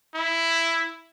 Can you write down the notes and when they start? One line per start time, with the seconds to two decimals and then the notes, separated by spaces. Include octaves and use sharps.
0.15 E4